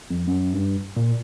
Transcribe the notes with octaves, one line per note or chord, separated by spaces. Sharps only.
F2
F#2
G2
A#2